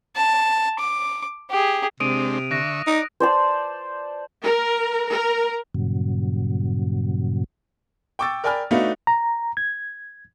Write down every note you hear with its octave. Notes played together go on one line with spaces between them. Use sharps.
A5
D6
G4 G#4
C3 G#3 C4 D4 D#6 D7 D#7
D3 E5 C#6 F#6 A#6
D#4 D5
C5 D5 A5
A#4
A#4
G2 A#2 C#3 F#3
G5 C#6 D6 E6 A6
A#4 D5 G5 G#5 B5 F6
A3 D4 D#4 F#4 B4 F5
A#5
G#6